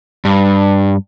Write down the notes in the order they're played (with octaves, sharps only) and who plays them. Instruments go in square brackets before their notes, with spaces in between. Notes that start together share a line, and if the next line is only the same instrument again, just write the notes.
[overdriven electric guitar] G2